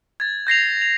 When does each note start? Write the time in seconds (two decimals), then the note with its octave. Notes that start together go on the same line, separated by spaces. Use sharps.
0.20 G#6 A6
0.47 G6 A#6 C7 F7
0.82 F7